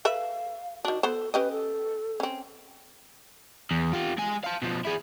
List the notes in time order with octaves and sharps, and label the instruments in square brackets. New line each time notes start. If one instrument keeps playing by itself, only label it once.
[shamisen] A4 B4 E5 [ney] F5
[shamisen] D#3 D4 [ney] F#4
[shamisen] B3 C5 [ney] A4
[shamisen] C#4 G4 D#5 [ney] B4
[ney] A4
[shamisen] C4 C#4
[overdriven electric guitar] E2
F4 G4
G#3 G#5
F5 A5
B2 F3
E4 G#4